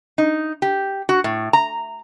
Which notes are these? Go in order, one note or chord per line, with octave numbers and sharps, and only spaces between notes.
D#4
G4
F#4
A2
A#5